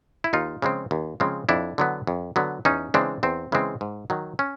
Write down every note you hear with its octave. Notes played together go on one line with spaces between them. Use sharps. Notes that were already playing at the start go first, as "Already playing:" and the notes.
E4
D#2 D#4 F4
C#3 F3 G#3 C4
D#2
C#3 F3 G#3 C4
F2 D4 E4
D3 F#3 B3
F2
D3 F#3 B3
E2 C#4 D#4
C#3 E3 G#3 C4 D4
E2 C4
C#3 E3 G#3 C4
G#2
D#3 F#3
C#4